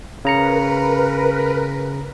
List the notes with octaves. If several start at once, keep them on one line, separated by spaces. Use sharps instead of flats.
C#3 A#4 B4 A#5 C#7